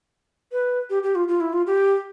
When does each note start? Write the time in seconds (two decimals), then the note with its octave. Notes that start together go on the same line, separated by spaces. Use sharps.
0.52 B4
0.90 G4
1.03 G4
1.15 F4
1.28 F4
1.40 E4
1.53 F4
1.66 G4